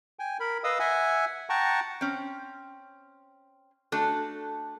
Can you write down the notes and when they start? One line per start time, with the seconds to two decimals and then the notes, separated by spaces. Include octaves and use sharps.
0.19 G5 G#5
0.40 A#4 B5
0.64 B4 D#5 F5 D#6 E6
0.79 E5 F#5 G#5
1.50 F#5 G5 A5 A#5 C#6
2.01 C4 C#4
3.92 A3 D4 F#4 A4